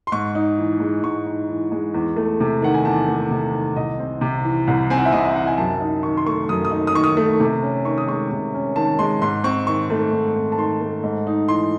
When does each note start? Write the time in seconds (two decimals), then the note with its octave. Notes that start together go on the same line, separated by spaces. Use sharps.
0.07 C6
0.12 G#2 C#6
0.35 D#4
0.58 E3
0.80 G#3
1.03 G#2 C#6
1.26 D#4
1.49 E3
1.72 G#3
1.94 E2
2.16 A3
2.40 C3
2.62 D#3 F#5
2.74 G#5
2.85 E2 A5
3.08 A3
3.31 C3
3.53 D#3
3.76 C2 D#5
3.99 C4
4.21 C3
4.44 E3
4.67 C2
4.90 C4 G#5
4.98 F#5
5.05 E5
5.12 C3 D#5
5.25 D#5
5.36 E3 F#5
5.47 G#5
5.58 F#2 A5
5.81 D#4
6.03 D#3 C#6
6.17 C6
6.26 A3 C#6
6.49 F#2 D#6
6.65 D#6
6.71 D#4
6.87 D#6
6.95 D#3 C#6
7.04 D#6
7.17 A3
7.40 C3
7.63 C#4
7.85 D#3 C#6
7.98 D#6
8.07 G#3 C#6
8.31 C3
8.54 C#4
8.76 D#3 A5
8.99 G#3 C6
9.22 G#2 C6
9.44 C4 C#6
9.67 D#3 C#6
9.90 A3
10.12 G#2
10.35 C4
10.52 A5
10.57 D#3 C6
10.81 A3
11.04 G#2
11.27 D#4
11.48 E3 C6